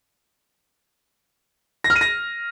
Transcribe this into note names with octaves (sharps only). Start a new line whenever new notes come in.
A#6
F6
D#7
A#6